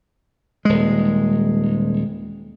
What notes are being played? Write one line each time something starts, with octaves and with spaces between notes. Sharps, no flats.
D#1 G#3